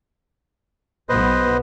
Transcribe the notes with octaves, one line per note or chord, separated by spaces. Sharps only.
B1 B3 B4 C5 D#5